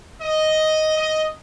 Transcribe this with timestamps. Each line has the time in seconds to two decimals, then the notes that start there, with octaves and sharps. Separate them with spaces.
0.21 D#5
0.97 D#5